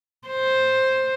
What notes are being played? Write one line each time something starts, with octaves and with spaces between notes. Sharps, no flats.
C5